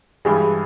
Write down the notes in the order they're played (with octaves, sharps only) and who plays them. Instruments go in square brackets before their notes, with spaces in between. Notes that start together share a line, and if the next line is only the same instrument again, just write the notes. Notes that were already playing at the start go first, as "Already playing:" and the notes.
[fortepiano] G2 E3 G3 G#3 G#4